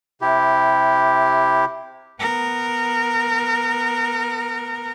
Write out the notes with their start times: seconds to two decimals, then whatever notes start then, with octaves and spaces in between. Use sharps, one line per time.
0.22 C3 E4 G4
2.20 B3 A#4